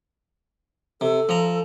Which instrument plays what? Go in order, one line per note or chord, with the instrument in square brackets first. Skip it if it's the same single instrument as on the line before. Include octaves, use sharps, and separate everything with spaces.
[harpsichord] C3 [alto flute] A4
[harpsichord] F3 A#5